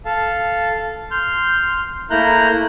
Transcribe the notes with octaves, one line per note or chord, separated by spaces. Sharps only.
A4 F5 A5
C6 F6 G6
A3 A#3 E4 A#5 F#6 G6